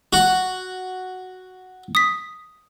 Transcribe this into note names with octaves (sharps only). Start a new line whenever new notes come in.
F#4
D#6 B6